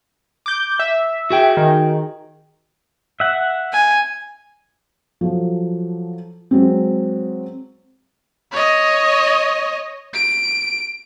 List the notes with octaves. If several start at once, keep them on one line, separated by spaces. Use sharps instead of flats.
D6 G6
E5
F#4 G#4 G5
D#3
E5 F#5
G#5
F3 F#3 A4
F#3 G#3 C4
C#5 D#5
D7